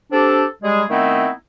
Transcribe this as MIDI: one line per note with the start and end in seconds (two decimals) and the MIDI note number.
0.12 0.45 60
0.12 0.45 62
0.12 0.45 67
0.12 0.45 69
0.63 0.83 55
0.63 0.83 56
0.63 0.83 68
0.89 1.29 51
0.89 1.29 57
0.89 1.29 59
0.89 1.29 60
0.89 1.29 63
0.89 1.29 64